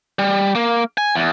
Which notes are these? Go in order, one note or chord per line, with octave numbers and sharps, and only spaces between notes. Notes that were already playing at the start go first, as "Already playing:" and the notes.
G3
A#3
G#5
E2